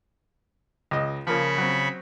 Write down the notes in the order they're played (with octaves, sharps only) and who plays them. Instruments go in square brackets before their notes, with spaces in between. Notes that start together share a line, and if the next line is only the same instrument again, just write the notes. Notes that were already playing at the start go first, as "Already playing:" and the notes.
[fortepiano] C#2 D#5
[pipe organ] C#3 B5 C#6 [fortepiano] F3 A#3
[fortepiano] F#3 C4